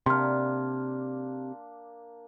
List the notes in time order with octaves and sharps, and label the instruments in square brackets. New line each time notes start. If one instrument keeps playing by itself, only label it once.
[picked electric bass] C3 [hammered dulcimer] A#3 D4 [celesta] C6 F6